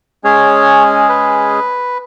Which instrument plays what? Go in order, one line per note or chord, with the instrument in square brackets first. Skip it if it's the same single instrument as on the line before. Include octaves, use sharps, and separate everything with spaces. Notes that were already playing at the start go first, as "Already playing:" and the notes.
[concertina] G#3 C#4 G#4 C#5
B4